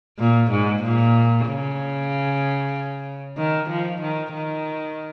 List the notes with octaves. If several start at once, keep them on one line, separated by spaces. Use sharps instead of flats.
A#2
G#2
A#2
C#3
D#3
F3
D#3
D#3